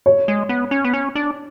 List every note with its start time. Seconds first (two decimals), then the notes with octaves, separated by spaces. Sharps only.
0.06 C#5
0.28 G#3
0.49 B3
0.71 C#4
0.84 B3
0.93 C#4
1.15 D4